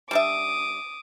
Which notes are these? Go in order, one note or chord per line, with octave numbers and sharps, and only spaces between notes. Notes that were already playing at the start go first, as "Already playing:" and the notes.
G3 D4 E5 D6 D#6